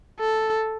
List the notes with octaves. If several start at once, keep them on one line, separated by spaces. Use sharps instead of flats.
A4